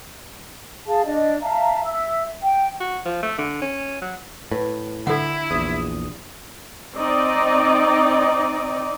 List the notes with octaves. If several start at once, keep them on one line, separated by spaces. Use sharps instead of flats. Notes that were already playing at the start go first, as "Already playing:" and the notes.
G#4 F5 A5
D4 D5 D#5
E5 F5 A5 A#5
E5 E6
G5
F#4
F3
A3
D3
C#4
F#3
A2 B4
D3 E4 A4 F#5
A#1 E2 D#6
C4 D#4 D5 D#5